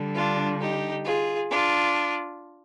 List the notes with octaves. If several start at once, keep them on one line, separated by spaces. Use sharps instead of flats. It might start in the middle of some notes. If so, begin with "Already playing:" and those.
Already playing: D3 G3
D4 F4
D#4 G4
F4 G#4
D4 F4